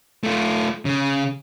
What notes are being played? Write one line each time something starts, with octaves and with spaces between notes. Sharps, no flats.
A3 F4
C#3